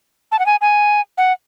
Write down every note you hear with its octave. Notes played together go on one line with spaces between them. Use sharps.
A5
F#5
G#5
G#5
F#5